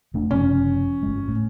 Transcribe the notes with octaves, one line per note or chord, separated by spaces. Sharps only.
E1 A3 D4
F#1 C3 F3 C#4
G1 G#3
A2